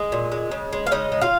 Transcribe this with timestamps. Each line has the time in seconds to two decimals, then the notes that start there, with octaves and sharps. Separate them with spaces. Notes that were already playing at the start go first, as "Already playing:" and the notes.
Already playing: G#3 D#5
0.12 A#2
0.32 G#3
0.51 C#3
0.73 G#3
0.86 F5
0.91 C#3 D#4 D#5
1.12 G#3
1.21 F4 F5